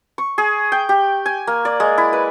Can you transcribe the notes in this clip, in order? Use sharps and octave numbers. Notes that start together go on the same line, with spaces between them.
C#6
G#4
G5
G4
G#5
A#3
D5
G#3
E4
B4